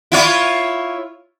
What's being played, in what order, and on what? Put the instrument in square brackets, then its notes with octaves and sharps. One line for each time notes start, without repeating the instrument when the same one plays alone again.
[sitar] E4 F4 C#5